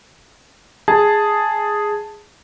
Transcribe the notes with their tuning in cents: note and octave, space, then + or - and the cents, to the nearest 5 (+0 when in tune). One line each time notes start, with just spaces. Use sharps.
G#4 +0 A5 +0